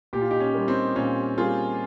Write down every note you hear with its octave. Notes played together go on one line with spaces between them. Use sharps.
A#2 G4
F4
D#4 G4
C#4
G3 A#3
C4 D#4
A#2 C#4 F4
G3 A#3 F4 G#4